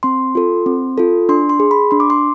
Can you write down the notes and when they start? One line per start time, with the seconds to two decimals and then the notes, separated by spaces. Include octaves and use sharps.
0.03 C4 C6
0.35 F4 A4
0.66 C4
0.98 F4 A4
1.29 D4 C6
1.49 C6
1.60 G#4
1.71 B5
1.91 D4 C6
2.00 D6
2.10 C6